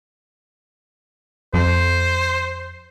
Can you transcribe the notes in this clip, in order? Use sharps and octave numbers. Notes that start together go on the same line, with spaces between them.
F2 C5